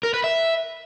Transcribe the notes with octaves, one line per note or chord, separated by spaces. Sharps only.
A#4
B4
E5